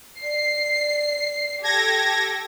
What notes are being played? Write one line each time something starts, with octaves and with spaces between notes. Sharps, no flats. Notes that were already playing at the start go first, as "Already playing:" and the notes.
D5 C7
G4 A4 G#6 A#6